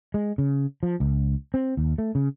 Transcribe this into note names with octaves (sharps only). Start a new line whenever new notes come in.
G#3
C#3
F3
C#2
C4
D#2
A3
C#3